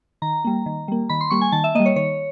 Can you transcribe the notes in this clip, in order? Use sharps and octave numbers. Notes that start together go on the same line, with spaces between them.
D#3 A#5
G3 A#3
D#3
G3 A#3
D#3 B5
C6
G3 A#3 C#6
G#5
D#3 A5
E5
G3 A#3 D#5
C#5
D#3 C#5